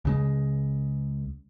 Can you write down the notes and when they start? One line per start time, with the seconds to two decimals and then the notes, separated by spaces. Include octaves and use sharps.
0.05 C#2 C#3 G#3